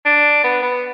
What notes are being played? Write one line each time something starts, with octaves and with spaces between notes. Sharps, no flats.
D4
B3
B3